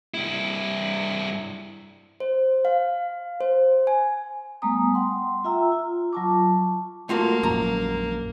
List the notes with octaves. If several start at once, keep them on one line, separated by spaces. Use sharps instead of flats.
G2 E4
C5
F5
C5
G#5
G3 A3 B3 G#5 A#5 D#6
F#5 G5 C6
F4 E5 G5 A#5 E6
F4
F#3 F4 A5 C#6 D6
A3 A#3 F4 F#4
A#1 F#2 A#5